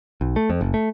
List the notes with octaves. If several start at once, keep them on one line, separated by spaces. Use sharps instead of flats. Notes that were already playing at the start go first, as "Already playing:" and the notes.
B1
A3
F2
F#1
A3